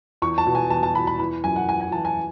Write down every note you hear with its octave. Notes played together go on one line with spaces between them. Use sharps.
E2 C#6
A5
B2
G#5
E2 A5
A5
E2 B5
B5
E3 B5
F#2 G#5
F#5
E3 G#5
G#5
E3 A5
G#5